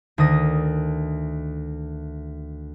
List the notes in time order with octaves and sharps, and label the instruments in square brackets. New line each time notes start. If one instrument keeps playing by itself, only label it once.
[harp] D2 D#3 D#6 A#6